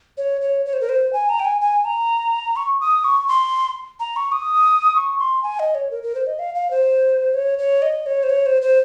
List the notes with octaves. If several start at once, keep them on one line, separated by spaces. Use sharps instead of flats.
C#5
C#5
C#5
C5
A#4
C5
G#5
A#5
G5
G#5
G#5
A#5
C#6
D#6
C#6
C6
A#5
C#6
D#6
C#6
C6
G#5
D#5
C#5
A#4
A#4
C5
D#5
F5
F5
C5
C#5
C#5
D#5
C#5
C5
C#5
C5
C5